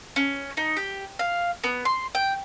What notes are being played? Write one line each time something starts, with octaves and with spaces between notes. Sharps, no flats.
C#4
D#4
G4
F5
B3
C6
G5